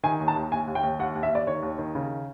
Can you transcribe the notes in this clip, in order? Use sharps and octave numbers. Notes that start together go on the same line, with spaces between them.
D#3 G#5
D#2
A5
D#2
D#2 G#5
D#2
G5
D#2
D#2 F#5
D#2
E5
D#2 D5
D#3 C#5
D#2
D#3
C#3